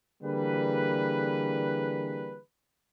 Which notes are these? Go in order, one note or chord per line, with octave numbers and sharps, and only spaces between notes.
D3 E3 G3 A#3 G#4 B4